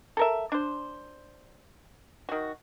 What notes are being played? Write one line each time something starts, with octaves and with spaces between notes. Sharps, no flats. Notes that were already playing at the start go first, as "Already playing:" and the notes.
A4 A#4 E5
D4 C5
D#3 F#4